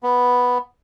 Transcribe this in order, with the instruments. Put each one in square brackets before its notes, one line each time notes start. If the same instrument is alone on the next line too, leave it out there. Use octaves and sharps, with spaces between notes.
[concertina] B3